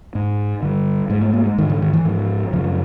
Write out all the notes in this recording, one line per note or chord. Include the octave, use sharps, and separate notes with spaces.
G#2
G2 D3
G#2 G#3
A3
A#3
G#3
G#2 D#3
D3
D#3
E3
G#2 F3
F#2 C#3 F3